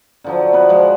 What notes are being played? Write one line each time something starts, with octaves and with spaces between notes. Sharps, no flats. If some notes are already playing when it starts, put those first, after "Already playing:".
D3 F3 F#3
B3 B4
F3 G#3